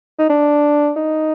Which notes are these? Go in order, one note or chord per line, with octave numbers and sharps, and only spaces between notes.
D#4
D4
D#4